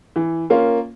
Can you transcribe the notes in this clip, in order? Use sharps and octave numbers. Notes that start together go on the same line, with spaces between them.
E3
A#3 C#4 F4